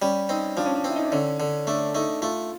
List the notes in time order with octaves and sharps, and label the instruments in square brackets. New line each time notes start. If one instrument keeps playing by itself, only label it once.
[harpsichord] G3 [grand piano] C#4
[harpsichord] C4 [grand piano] D#4
[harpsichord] F3 [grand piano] D4
[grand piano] C#4
D4
[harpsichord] C4 [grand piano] E4
[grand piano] D#4
D4
[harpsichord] D3 [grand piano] C#4
[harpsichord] D3
[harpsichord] A3 [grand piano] D4
[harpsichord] A3 [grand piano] D#4
[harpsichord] A3 [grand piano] F4